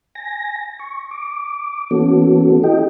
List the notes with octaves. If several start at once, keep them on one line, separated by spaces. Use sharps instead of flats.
G#5 A#6
C#6
D6
E3 A#3 B3 C#4 F#4 A4
E4 G4 A4 D#5 G5